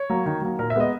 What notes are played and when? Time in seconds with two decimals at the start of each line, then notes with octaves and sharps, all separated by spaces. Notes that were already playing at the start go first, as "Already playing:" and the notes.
Already playing: C#5
0.10 F#3 A#3
0.26 D#3
0.42 F#3 A#3
0.59 A#2 A#4
0.70 E5
0.76 G#3 B3 D#5